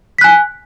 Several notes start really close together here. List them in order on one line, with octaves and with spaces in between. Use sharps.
B6 F#6 G#5